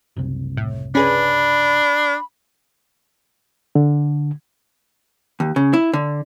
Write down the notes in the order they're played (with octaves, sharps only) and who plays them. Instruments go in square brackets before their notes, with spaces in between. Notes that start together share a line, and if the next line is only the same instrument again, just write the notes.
[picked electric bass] F#1 C2
[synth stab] A2
[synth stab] C#4 G#4 B4 [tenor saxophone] D4 [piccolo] B5
[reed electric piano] D3
[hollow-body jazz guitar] D#2
C#3
E4
D3